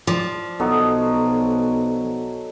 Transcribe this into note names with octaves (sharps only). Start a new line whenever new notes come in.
F3 D5
B1 F#3 A4 D#5